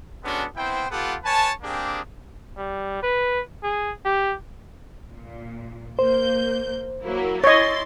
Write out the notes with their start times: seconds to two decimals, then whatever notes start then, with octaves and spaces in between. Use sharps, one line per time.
0.23 G#3 B3 C#4 D4 F#4 A4
0.56 B3 C4 E4 C5 G5
0.90 B3 F4 G4 A4 B4 F#5
1.24 B4 C#5 G#5 A5
1.62 A#3 C4 D4 G4 G#4
2.57 G3
3.03 B4
3.63 G#4
4.05 G4
5.10 A#2
5.99 A#3 C5 G6
7.03 F#3 A#3 E4
7.44 E4 C#5 D#5 C6 A6